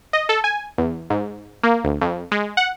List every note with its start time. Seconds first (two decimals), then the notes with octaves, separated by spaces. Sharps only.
0.13 D#5
0.29 A4
0.44 G#5
0.78 E2
1.10 G#2
1.63 A#3
1.84 D2
2.01 F2
2.32 G#3
2.57 F#5